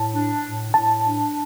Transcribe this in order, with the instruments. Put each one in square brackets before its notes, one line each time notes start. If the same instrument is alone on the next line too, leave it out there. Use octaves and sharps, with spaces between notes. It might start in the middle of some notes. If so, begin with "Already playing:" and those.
Already playing: [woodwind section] A2 [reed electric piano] A5
[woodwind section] D4
A2
[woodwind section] A2 [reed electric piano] A5
[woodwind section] D4